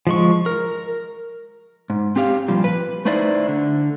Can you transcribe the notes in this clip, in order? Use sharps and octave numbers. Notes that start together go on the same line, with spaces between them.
F3 G#3 C#6
A#4
G#2
C4 G4 F5
A#2 F3 G3
B4
A3 D#4 E4 C5 D5
D3